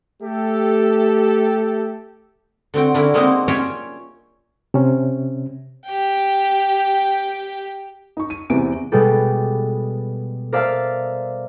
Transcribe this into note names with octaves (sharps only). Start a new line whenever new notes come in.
A3 G4 A4
D3 C4 F#4 G5
D3 C#4 D4 E4 A#4
G#3 A#3 C4 D#4 E4 F#4
C#4 F4 C#5 E5 G5 A#5
C3 C#4
G4 G5
D#4 C#6
D#7
E2 C3 E3 D7
B2 G3 G#3 B3 G4 A4
A#4 C5 D5 E5 F5 A5